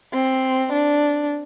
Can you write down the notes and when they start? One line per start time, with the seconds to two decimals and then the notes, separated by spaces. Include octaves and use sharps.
0.13 C4
0.73 D4